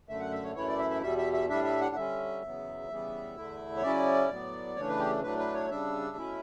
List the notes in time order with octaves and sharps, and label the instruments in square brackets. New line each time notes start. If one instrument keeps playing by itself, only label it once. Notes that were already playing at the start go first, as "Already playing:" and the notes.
[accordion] F#2 D3 A3 E5
F#5
E5
C#5
F#2 E3 A3 E4 C#5
D5
E5
E5
E2 B2 G3 E5
E5
E5
A2 G3 D4 E5
E5
F#5
F#5
D3 G3 C#4 E5
E2 C#3 F#3 B3
C#3 E3 G3 B3
E2 D3 A3 E4
C#5
C#3 F#3 C#4 E4 D5
A2 F#3 B3
C#3 E3 A3 D4 C#5
B4
G4
A2 F#3 A3 D4 B4
B4
C#5
C#3 G3 D4 E5
B2 A3 C#4 E4